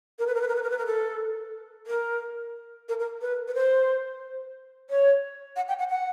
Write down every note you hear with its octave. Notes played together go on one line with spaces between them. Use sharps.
A#4
B4
A#4
B4
A#4
B4
A#4
B4
A#4
A4
A#4
A#4
A#4
B4
B4
C5
C#5
F#5
G5
F#5
F#5